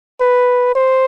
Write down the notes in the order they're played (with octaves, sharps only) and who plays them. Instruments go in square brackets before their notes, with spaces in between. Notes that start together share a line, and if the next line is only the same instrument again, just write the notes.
[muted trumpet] B4
C5